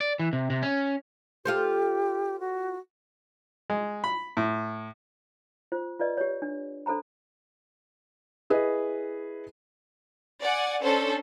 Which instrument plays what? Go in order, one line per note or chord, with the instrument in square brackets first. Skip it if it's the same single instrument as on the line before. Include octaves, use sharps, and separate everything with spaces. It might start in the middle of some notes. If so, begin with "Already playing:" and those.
[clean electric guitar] D5
E3
C3
C3
C#4
[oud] F4 A4 C5 [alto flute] G4
[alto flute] F#4
[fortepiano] G#3
B5
A2
[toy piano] F4 C5
F4 B4 D5 D#5
G4 C#5
D4
D4 A4 C5 A#5 B5
[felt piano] E4 G#4 B4 D#5
[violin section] D5 F#5 G#5
C#4 D4 A4 C5